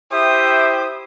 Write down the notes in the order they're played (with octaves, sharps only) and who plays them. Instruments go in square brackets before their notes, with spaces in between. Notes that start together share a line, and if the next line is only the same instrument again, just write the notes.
[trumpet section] E4 G4 C5 E5 G5 [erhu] D#6